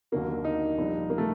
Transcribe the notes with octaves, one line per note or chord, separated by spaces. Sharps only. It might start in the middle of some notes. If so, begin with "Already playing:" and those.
D#2 D3 F#3 A#3
D#4
A#1 A#2 G3
A#3
A3